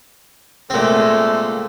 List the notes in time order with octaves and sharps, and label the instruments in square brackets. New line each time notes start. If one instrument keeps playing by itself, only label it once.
[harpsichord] A#2 C4 [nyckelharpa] G#3 A3